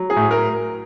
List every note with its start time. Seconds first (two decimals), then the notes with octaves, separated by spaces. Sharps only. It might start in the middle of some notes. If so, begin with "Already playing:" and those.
Already playing: F#3
0.10 G#4
0.16 A2
0.31 A#4